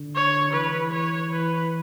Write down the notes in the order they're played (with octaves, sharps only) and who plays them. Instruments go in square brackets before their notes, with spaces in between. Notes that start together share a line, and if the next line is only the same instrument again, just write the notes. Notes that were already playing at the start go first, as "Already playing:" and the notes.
Already playing: [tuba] D3
[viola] C#5
[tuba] E3 [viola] B4
[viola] C#5
B4